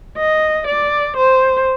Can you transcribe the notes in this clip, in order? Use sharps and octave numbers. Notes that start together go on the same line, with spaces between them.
D#5
D5
C5